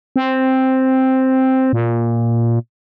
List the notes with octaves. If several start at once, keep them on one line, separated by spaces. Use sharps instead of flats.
C4
A#2